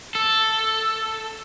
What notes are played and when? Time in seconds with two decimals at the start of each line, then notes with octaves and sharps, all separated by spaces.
0.15 A4